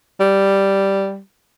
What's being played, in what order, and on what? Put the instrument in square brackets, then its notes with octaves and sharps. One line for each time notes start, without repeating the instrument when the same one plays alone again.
[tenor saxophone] G3